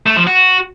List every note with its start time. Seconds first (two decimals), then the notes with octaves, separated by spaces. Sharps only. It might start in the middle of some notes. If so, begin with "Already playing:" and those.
0.06 A3
0.17 F3
0.27 F#4